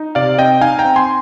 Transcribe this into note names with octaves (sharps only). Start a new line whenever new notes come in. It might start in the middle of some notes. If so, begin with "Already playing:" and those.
Already playing: D#4
C3 D5 F5
C4 D#5 G5
D#4 F5 G#5
G5 A#5
C4
G#5 C6